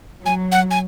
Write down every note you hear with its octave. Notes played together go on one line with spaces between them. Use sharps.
F#3 G#5
F#5
G#5